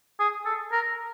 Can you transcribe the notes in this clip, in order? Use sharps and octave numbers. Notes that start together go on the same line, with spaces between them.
G#4
A4
A#4